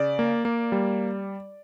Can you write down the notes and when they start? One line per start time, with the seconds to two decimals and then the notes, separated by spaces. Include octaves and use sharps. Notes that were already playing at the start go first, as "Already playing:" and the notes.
Already playing: C#3 D5
0.19 A#3
0.45 A#3
0.72 G3